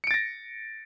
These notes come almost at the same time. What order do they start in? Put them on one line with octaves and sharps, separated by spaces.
C#7 D7 A6 A#6